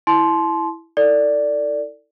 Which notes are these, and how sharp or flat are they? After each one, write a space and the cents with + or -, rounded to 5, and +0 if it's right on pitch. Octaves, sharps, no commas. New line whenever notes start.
E4 +0 A5 -30 C6 +0
E4 -35 A4 +30 D5 +0